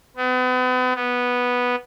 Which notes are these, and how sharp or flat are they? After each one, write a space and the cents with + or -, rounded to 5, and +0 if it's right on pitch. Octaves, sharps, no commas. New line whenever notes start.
B3 +40
B3 -5